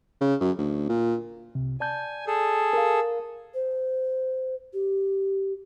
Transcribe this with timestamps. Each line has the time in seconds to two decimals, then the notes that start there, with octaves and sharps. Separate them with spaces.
0.21 C#3
0.41 F#2
0.58 D2
0.89 A#2
1.55 C2 C3
1.80 D5 G#5 A5 G6
2.27 G#4 A4
2.73 A#4 F5
3.54 C5
4.74 G4